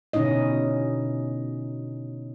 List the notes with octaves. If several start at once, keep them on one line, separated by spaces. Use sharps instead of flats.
B2 D3 C#4 D#4 E4 D#5